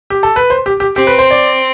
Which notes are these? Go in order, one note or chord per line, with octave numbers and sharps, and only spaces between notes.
G4
A4
B4
C5
G4
G4
C4 G4
B4
C5
D5